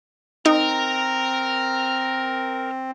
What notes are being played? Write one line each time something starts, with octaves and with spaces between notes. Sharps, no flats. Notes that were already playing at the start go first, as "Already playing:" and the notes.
C4 D#4 A#4